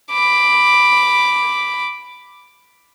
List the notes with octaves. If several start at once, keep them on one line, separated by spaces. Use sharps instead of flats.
B5 D6